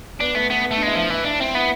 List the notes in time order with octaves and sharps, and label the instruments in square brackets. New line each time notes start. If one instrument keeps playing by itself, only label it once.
[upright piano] B3 [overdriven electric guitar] D4
[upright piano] A3 [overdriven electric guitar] B3
[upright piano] A3 [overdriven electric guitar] B3
[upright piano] B3
[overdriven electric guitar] A3
[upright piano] D4
[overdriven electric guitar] G#3 [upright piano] E4
[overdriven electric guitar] F3 [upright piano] E4
[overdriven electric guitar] E3 [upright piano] E4
[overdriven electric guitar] D4 [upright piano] E4
[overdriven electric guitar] C4 [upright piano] E4
[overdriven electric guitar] B3 [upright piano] E4